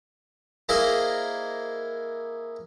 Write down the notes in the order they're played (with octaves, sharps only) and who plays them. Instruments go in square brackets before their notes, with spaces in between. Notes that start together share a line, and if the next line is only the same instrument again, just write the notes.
[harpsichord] A#3 E4 G#4 C5 D#5 F5